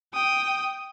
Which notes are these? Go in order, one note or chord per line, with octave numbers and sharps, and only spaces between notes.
G5 D#6